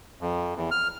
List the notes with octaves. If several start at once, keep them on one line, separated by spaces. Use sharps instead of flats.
F2
E2
F6